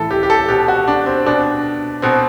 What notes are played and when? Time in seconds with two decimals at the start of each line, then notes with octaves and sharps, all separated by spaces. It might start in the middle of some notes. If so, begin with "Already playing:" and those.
Already playing: A2 E3 A4
0.11 G4
0.23 G4
0.30 A4
0.48 B2 G4
0.68 F#4
0.88 D4
1.06 C4
1.26 B2 D4
2.02 B2 C4